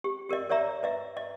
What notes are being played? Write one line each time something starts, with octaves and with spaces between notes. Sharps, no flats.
G4
G4 A#4 D5 D#5
A#4 C#5 D5 E5 A#5
B4 D#5 E5
D#5